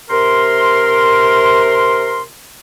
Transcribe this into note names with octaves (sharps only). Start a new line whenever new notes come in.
C3 A#4 C6